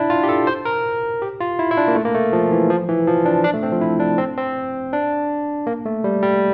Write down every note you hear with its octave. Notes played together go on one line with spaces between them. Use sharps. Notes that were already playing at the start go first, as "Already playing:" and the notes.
Already playing: D4 E4
F4
G4
A4
C5
A#4
G4
F4
E4
E4
D4
A#3
A3
A#3
A3
F3
E3
F3
E3
F3
D4
D4
A3
C4
F3
E4
D4
C4
C4
D4
A#3
A3
G3
G3